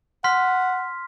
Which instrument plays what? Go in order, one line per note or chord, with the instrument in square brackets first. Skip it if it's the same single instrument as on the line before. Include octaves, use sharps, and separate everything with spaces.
[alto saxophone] F#5 [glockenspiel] C6 F6 B6